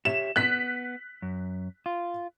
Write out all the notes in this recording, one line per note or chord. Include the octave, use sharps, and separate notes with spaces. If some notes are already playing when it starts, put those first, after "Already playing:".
G4 C#5 E5 E7
B3 F#6 B6
F#2
F4